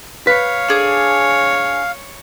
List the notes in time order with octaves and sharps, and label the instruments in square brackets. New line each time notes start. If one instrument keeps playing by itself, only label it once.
[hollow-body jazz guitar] B4 [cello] C#5 [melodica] F5
[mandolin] D4 G#4